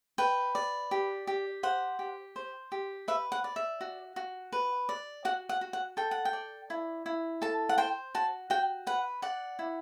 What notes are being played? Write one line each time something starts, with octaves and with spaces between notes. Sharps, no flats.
B4 G5
D5
G4
G4
C5 F#5
G4
C5
G4
B4 E5
F#5
D5
E5
F#4
F#4
B4
D5
F#4 F#5
F#5
F#4
F#5
A4 G5
F#5
G5
D5
E4
E4
A4 A5
F#5
C5 G5
F#4 A5
F#4 G5
B4 F#5
D5 F#5
E4